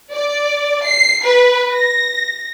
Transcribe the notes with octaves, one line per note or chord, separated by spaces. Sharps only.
D5
C7
B4
A#6